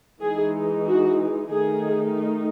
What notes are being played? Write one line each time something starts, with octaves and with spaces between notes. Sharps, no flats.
E3 G#3 D#4 G#4
F#4
D#3 A3 D#4 G#4